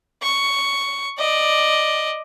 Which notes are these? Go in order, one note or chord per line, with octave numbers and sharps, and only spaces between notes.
C#6
D5 D#5